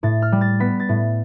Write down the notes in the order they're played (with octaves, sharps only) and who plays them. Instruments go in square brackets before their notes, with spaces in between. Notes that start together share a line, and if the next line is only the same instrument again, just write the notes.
[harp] A2 A6
F6
G3
A6
B3 B6
A6
A2